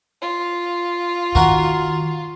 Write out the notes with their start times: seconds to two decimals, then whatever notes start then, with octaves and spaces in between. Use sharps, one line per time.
0.22 F4
1.35 D#3 F#4 A#4 F#5